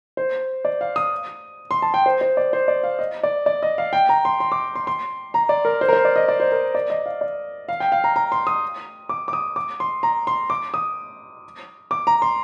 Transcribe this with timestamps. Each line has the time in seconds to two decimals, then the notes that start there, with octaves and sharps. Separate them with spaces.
0.17 C5
0.65 D5
0.81 F5
0.96 D#6
1.71 C6
1.82 A5
1.94 G5
2.06 C5
2.21 C5
2.37 D5
2.53 C5
2.68 D5
2.83 F5
2.99 D#5
3.23 D5
3.46 D5
3.63 D#5
3.78 F5
3.93 G5
4.09 A#5
4.25 C6
4.40 C6
4.52 D6
4.75 C6
4.87 C6
5.34 A#5
5.49 D5
5.65 A#4
5.81 C5
5.89 A#4
5.93 C5
6.05 D5
6.16 D#5
6.28 D5
6.40 C5
6.52 A#4
6.75 D5
6.90 D#5
7.06 F5
7.21 D5
7.69 F5
7.80 G5
7.92 F5
8.04 A#5
8.16 A#5
8.32 C6
8.47 D#6
9.09 D6
9.28 D6
9.33 D#6
9.56 D6
9.80 C6
10.03 A#5
10.27 C6
10.50 D6
10.74 D#6
11.91 D6
12.07 A#5
12.22 C6